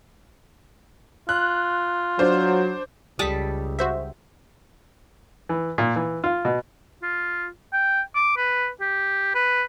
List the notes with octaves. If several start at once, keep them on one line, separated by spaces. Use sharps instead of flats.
F4 F#6
F#3 D4 C5
C#2 G3 A4 A5 D#6 B6
F#4 C5 E5
E3
A#2
E3
F4
B2
F4
G5
D6
B4
G4
B4